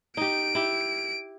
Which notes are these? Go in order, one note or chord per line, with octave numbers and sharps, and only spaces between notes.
D#4 G4 D7
E4 G4